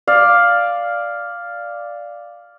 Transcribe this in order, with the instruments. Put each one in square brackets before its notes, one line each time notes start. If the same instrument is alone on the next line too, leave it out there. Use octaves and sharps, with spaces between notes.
[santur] D5 F5